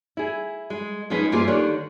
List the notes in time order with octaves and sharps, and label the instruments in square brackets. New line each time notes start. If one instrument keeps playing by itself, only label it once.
[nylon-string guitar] E4 G#4
G#3
F3 G#3 C#4 D#4 G#4 B4
G2 A#3 E4 F4 G#4 C5
D3 D#3 D4 G4 A#4 C#5